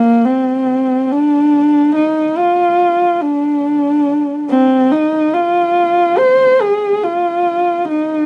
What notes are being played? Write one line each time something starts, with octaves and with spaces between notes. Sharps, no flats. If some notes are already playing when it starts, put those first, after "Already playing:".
Already playing: A#3
C4
D4
D#4
F4
D4
C4
D#4
F4
C5
G#4
F4
D#4